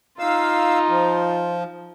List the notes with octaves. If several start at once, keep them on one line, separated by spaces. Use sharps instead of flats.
D#4 F4 F5 E6
F3